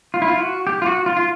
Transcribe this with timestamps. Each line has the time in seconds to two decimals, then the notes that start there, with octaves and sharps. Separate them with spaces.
0.14 F4
0.22 E4
0.28 F4
0.40 F#4
0.67 G4
0.82 F4
0.86 F#4
1.06 F4
1.17 F4